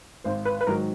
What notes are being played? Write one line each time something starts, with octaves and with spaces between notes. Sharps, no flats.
G#1 C5
B4
B4
G#2 D#3 F#3 A#4